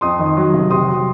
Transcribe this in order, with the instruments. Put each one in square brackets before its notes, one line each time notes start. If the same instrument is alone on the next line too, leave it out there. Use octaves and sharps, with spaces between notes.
[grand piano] F2 C6 D#6
D#3
F#3
F1
C3 C6 D#6
F#3